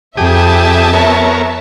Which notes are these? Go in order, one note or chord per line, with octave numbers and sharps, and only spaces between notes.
F2 G4 G#4 E5 A5 D#6
B3 A#4 C#5